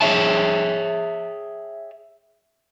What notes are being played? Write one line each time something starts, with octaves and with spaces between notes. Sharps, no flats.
G#4 A#4 C#5 E5 G5 A5